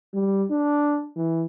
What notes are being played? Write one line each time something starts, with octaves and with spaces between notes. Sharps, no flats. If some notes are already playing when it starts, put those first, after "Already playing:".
G3
D4
E3